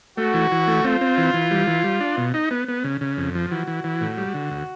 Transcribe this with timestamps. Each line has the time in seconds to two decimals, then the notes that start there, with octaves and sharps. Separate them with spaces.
0.18 A3 F#4
0.34 E3
0.51 E3
0.67 A3
0.84 C4 F4
1.01 C4
1.17 E3
1.34 E3
1.51 G3
1.67 E3
1.84 G3
2.00 D4
2.17 B2
2.34 D#4
2.51 B3
2.68 B3
2.84 C#3
3.01 C#3
3.17 F2
3.35 F3
3.51 E3 F#4
3.67 E3
3.84 E3
4.01 A2
4.18 G3
4.34 D3
4.51 D2